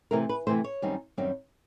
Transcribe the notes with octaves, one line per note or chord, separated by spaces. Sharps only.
C3 E3 A3 A#4
B4
C3 E3 A3 C5
C#5
F#2 D#3 G3 C4 D#4
F#2 D#3 G3 C4 D#4